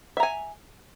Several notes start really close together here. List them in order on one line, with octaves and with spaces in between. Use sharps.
E5 A#5 G#5